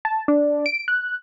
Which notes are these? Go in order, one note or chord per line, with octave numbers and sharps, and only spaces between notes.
A5
D4
D7
F#6